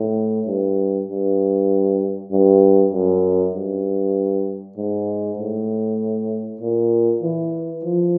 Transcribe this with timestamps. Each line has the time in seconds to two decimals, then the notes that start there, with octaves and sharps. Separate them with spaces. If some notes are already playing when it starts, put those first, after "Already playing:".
Already playing: A2
0.47 G2
1.09 G2
2.32 G2
2.93 F#2
3.55 G2
4.77 G#2
5.39 A2
6.61 A#2
7.23 E3
7.84 F3